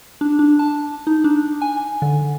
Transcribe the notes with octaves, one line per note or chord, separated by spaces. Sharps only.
D4
D4
A5
D#4
D4
G#5
D3